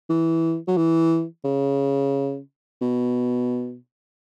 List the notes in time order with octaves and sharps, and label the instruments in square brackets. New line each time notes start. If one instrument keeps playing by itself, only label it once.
[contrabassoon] E3
F#3
E3
C#3
B2